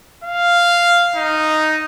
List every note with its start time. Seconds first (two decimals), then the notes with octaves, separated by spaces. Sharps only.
0.24 F5
1.16 D#4